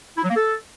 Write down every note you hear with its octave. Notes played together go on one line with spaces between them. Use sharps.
E4
F#3
A#3
A4